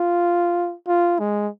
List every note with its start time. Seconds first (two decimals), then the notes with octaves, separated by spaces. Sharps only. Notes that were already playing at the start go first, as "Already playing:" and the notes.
Already playing: F4
0.88 F4
1.19 G#3